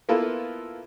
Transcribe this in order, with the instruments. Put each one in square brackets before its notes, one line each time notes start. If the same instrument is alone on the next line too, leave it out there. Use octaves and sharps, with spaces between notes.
[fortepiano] A#3 B3 E4 F4 A4 B4